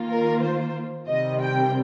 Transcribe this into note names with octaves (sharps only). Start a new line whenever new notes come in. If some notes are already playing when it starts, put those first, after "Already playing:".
Already playing: D#3 A#3 F4
A#4
C5
C3 D#3 G3 C4 D#5
G5